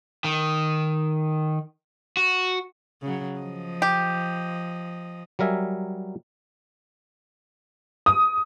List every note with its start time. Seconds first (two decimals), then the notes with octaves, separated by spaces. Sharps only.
0.24 D#3
2.17 F#4
3.02 C#3 F#3
3.39 F3 D#5
3.82 G4
5.39 F#3 G3 A#4 E5 G#5
8.06 D#6